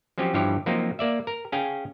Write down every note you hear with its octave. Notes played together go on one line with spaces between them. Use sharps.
F3 F#3 C4 C#4 G4
G2 E3 F3 G4 C#5
F3 F#3 A#3 C4 D#4
A#3 D5 E5
A#4
C#4 G#4 F5 G5